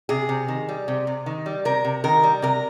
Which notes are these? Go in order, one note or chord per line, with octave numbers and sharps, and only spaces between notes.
C3 G#4
C3
D#3
G3
C3
C3
D#3
G3
C3 A#4
C3
D#3 A#4
G3
C3 A#4